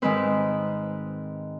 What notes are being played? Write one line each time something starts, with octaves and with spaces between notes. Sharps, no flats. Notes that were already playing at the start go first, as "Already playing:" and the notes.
G#2 D#3 G#3 C4 B4